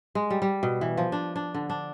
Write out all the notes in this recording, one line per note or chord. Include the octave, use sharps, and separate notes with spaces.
G#3
G3
G3
B2
E3
F3
D4
D4
D3
D4